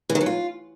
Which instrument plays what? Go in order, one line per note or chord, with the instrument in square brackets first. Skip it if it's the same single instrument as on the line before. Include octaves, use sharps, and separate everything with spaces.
[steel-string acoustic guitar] E3
D#3
F#3
F4